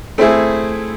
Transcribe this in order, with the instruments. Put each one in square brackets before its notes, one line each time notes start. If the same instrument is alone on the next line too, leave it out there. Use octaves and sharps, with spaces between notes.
[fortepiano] A3 C4 E4 G#4